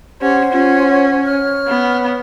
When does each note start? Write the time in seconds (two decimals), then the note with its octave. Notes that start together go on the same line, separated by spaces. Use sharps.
0.21 C#4 G4 C5 F#5
0.53 C#4 F4
0.88 C#5
1.26 F6
1.67 B3